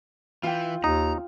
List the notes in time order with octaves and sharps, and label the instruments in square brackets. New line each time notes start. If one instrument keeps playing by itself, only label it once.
[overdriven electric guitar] E3 [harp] F4 G5
[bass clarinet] D#2 [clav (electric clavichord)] D#4 [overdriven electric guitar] A#5